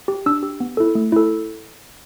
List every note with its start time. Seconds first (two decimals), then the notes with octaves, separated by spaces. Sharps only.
0.08 G4
0.26 D4 E6
0.43 G4
0.60 B3
0.77 E4 A4
0.95 A3
1.12 E4 A4